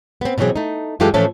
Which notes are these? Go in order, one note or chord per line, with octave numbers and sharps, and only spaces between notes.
B3 C4
B2 E3 F#3 C4 G#4
A3 D#4
F#2 E3 G#3 F4 G4 A4
A2 E3 F3 A3 C#4 A4